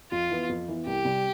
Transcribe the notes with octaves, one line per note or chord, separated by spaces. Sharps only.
F2 F4
E3 B3
F2
E3 B3
C2 G4
C3 G3